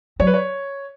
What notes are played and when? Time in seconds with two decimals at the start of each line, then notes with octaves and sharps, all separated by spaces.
0.20 F#3 C#5
0.27 B4
0.34 C#5